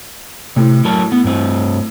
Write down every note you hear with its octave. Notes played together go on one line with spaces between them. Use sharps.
A2 C3
F#3 A#4 A5
B3
G2 C4